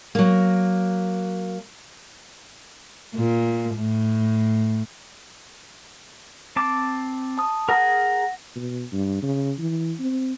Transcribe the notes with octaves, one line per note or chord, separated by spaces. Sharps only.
F#3 A#3
A#2
A2
C4 A5 D6
A5 D#6
G#4 A#4 F#5 A#6
B2
G2
C#3
E3
C4